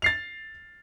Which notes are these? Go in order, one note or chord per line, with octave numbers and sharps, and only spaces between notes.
A6 C7 F7